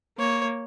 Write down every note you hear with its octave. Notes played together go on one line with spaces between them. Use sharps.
A#3 C#5